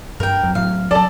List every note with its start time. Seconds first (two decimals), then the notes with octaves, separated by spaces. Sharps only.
0.20 G2 A#4 G5
0.43 F2 F#3
0.55 A2 F#3 F5
0.91 F#3 A4 D5 A5